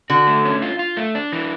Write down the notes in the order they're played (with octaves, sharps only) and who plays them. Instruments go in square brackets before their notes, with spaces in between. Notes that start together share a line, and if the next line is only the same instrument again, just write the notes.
[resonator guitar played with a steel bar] D3 [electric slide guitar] F#4
[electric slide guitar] A3
C#4
F4
F4
A3
D4
E3